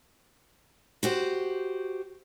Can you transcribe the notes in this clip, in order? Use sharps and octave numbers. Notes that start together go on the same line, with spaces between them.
F#4 G4 C5